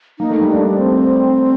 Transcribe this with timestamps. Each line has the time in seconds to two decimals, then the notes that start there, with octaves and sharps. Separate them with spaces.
0.19 A#3 D#4
0.30 A3
0.41 G3
0.48 A3 D4
0.77 C4